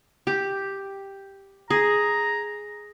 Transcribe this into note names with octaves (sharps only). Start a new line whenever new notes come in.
G4
G#4 A#5